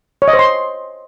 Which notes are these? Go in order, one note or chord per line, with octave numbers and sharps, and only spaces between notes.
C#5
D#5
C5
C6